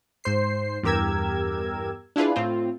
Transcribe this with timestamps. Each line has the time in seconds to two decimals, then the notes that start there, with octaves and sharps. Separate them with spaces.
0.24 G#2 C5 C7
0.83 E2 G2 G4 A#4 E6 G#6
2.16 D4 E4 F4 G#4 B4
2.36 A2 C4 F4